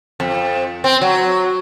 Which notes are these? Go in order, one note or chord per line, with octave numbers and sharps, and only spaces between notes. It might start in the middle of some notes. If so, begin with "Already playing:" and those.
F2
C4
F#3